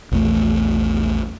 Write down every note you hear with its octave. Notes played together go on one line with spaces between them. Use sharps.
A#1 E2 A3